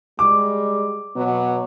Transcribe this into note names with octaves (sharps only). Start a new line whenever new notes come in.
G3 G#3 D6
B2 F#3 B3